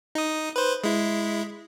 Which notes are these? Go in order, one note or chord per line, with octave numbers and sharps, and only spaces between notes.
D#4 D#6
B4 C5
G#3 E4